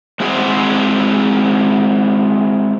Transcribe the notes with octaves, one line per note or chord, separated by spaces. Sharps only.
G#3 C4 E4 F#4 G#4 C5